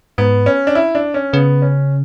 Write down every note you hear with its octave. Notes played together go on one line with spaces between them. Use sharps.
G#2 B3
C#4
D4
E4
D4
C#4
C#3 B3
C#4